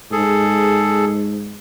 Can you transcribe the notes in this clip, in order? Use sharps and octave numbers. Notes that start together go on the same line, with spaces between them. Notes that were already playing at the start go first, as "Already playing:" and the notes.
G#2 G#4 A4